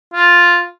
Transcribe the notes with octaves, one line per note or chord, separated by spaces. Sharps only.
F4